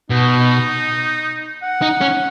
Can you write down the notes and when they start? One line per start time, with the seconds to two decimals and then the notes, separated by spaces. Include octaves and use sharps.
0.10 B2 D#4
1.63 F#5
1.82 D#4
2.01 C#4